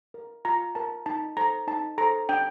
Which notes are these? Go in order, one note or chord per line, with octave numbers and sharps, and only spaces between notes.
A#4
F4 A#5
A#4 A5
D#4 A5
A4 C5 A#5
D#4 A5
A4 C5 A#5
D4 G5